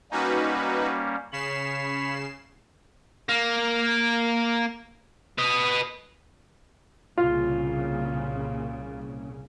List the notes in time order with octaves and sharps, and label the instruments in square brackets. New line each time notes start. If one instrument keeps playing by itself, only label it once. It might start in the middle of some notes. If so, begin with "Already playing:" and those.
[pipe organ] G3 A#3 C#4 [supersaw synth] D#4 F#4 B4
[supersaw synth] C#3 C7 E7 [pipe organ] C#5 B5
[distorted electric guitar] A#3
B4 D#5
[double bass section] C2 A#2 C#3 [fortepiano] F4